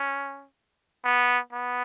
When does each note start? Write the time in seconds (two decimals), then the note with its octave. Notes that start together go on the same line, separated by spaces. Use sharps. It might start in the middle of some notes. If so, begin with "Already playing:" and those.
Already playing: C#4
1.05 B3
1.53 B3